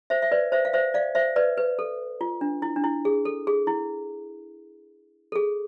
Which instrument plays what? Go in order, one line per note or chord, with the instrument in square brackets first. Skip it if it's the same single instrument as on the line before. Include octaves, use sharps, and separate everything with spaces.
[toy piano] C5 E5
E5
B4 D5
C5 E5
F5
C5 E5
D5 F5
C5 E5
B4 D5
B4
A4
F4
D4
E4
D4
E4
G#4
A4
G#4
E4
A4
G#4